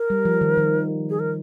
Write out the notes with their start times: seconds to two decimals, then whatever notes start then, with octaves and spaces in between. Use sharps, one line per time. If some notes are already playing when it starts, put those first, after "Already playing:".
Already playing: A#4
0.10 G3
0.25 F3
0.41 D#3
0.57 D#3
1.10 G#4
1.19 A#4